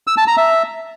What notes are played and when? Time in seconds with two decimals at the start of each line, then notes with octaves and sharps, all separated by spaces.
0.07 E6
0.17 A5
0.27 A#5
0.37 E5